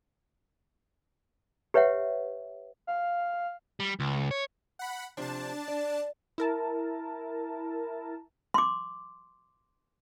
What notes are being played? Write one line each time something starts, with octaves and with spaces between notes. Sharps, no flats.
G4 B4 C#5 E5 F#5
F5
G3
C#2
C#5
F#5 B5
C3 F3 D4 A5
D5
E4 A#4 A5
C6 D6